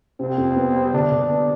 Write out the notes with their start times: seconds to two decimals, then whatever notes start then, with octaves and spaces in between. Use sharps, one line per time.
0.19 C3 C4
0.38 F2
0.56 B3
0.75 G3
0.94 D3 D4
1.12 D3
1.30 B3